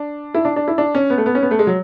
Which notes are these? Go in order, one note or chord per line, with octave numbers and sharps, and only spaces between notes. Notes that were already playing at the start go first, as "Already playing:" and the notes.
Already playing: D4
E4
D4
D4
E4
D4
C#4
B3
A3
B3
C#4
B3
A3
G#3
F#3